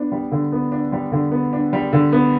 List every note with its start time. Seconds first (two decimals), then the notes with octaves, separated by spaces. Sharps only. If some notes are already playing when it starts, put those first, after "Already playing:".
Already playing: B3 D4
0.12 G3
0.32 D3
0.52 B3
0.72 D4
0.92 G3
1.12 D3
1.32 B3
1.53 D4
1.73 G3
1.93 D3
2.13 B3